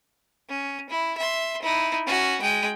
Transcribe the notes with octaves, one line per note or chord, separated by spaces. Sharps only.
C#4
E4
E5 C6
D#4 E4
C#4 F#4
G#3 G5